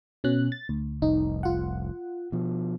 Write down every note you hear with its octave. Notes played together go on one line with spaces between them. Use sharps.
B2 C#4 F#6
A6
D2
F1 C2 D#4
F4 F#5
B2 F3